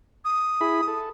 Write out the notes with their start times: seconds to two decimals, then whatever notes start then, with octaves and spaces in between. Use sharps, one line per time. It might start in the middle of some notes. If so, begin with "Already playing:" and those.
0.25 D#6
0.61 E4 G#4 B5
0.88 A4